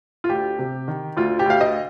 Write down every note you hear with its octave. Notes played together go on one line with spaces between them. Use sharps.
F4
D2 G4
C3
D#3
D2 F4
G4
D2 F5
D#5